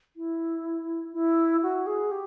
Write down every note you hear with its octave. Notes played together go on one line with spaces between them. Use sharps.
E4
E4
F#4
G#4
G4